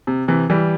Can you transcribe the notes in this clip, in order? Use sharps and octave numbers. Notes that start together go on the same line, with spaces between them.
C3
C3 E3
E3 G3